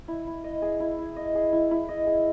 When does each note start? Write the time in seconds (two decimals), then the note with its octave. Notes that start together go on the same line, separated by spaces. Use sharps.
0.08 E4
0.27 E4
0.44 D#5
0.62 G#4
0.80 E4
0.99 E4
1.16 D#5
1.35 G#4
1.53 E4
1.71 E4
1.88 D#5
2.06 G#4